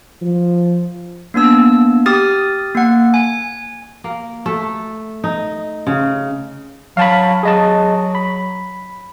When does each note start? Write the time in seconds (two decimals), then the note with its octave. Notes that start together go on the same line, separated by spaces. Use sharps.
0.22 F3
1.34 A#3 B3 D4 E6
2.06 G4 D#6 F6 A6
2.75 A#3 F#5
3.14 G#5
4.04 A#3
4.46 A3
5.24 D#4
5.87 C#3
6.97 F#3 F5 A5 B5
7.43 F#3 G#4 D#5 A5
8.15 B5